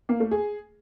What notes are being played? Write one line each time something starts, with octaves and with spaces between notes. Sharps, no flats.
A#3
A3
G#4